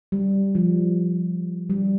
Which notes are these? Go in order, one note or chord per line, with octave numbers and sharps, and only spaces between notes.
G3
F3
G3